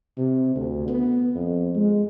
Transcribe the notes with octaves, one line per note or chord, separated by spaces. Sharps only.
C3
D2
B3
F2
G#3